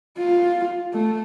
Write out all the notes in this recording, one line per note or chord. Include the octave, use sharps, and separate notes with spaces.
F4
A3